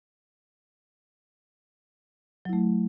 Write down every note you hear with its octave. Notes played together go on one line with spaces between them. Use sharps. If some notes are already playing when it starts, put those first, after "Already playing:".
F#3 A3 E4